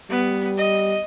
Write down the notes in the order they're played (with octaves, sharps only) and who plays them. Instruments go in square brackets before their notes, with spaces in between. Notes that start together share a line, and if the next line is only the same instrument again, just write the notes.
[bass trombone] G3 [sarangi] B3
[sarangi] D#5